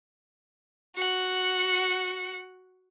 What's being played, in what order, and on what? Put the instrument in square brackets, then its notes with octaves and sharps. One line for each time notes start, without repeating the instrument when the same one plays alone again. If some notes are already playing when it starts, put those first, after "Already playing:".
[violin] F#4 F#5